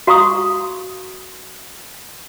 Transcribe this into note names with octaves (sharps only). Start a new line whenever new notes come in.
F#4 F5 A#5 C#6 D#6